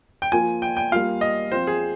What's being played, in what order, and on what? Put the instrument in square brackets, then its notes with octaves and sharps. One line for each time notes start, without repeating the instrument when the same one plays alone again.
[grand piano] G5
[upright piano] F3 A#3 F4 [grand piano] G#5
[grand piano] G5
G5
[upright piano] G3 A#3 F4 [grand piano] F5
[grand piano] D#5
[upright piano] F3 C4 F4 [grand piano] C5
[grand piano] G#4